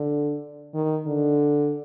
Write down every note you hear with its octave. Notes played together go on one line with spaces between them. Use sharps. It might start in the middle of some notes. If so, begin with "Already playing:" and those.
Already playing: D3
D#3
D3